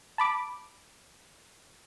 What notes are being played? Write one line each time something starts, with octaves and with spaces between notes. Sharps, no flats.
A5 B5 D6